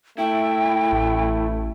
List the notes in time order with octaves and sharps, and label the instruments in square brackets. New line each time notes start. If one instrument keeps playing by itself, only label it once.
[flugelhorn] A3 [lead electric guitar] E4 [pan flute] G5
[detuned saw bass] A1